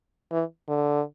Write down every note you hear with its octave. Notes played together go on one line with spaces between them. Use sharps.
E3
D3